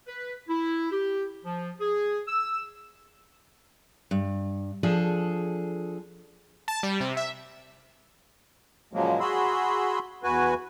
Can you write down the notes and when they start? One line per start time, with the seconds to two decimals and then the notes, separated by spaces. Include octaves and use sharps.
0.07 B4
0.48 E4
0.92 G4
1.45 F3
1.81 G#4
2.27 E6
4.11 G2
4.83 F3 D4 G#4 A4
6.68 A5
6.83 G3
7.00 C3
7.17 E5
8.93 A#2 C#3 F3 F#3 G#3 A#3
9.20 F#4 G#4 B5 C6 E6
10.24 E2 F#4 B4 G#5